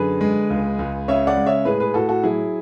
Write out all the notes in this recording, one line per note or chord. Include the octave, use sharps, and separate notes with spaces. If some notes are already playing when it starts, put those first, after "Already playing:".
Already playing: F#2 D3 G#4 B4
G#3
C#2
C#2
C#3 C#5 E5
D5 F#5
G#3
C#5 E5
A2 G#4 B4
G#4 B4
A2 F#4 A4
F#4 A4
F#3 E4 G#4